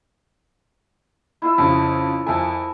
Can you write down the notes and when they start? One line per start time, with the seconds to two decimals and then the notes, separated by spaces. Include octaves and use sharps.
1.42 E4 F4 E5
1.58 F2 C#3
2.27 F2 A#4 E5 G#5 A5